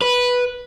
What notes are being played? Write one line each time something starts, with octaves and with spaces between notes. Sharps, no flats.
B4